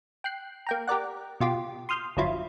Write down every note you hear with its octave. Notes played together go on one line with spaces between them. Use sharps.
G5 F#6 C7
A#3 G5 A#5
G4 A#4 D5 F#5
B2 F4 G4
C6 D#6 F6 G6
G1 F2 F#3 E4 F4